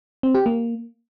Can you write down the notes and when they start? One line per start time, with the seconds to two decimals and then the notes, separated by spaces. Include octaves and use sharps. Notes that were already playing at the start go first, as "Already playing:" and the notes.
0.23 C4
0.35 G4
0.46 A#3